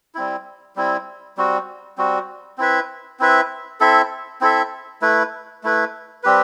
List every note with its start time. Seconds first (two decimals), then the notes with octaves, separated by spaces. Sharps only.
0.15 G3 C4 E4
0.76 G3 C4 E4
1.37 G3 C4 F#4
1.98 G3 C4 F#4
2.58 C4 E4 B4 E5
3.20 C4 E4 B4 E5
3.80 C4 E4 A4 E5
4.41 C4 E4 A4 E5
5.02 A3 E4 B4
5.63 A3 E4 B4
6.23 G3 C4 G4 B4